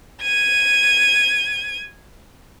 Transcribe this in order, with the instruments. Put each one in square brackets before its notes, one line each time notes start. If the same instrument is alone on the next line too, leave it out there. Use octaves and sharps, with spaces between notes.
[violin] G#6 D#7